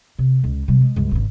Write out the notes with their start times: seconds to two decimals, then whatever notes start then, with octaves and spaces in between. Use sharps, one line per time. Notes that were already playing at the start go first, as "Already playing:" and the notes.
0.18 C3
0.43 C#2
0.68 C3 G3
0.81 G#3
0.96 C#2 G2
1.11 G#1 C#3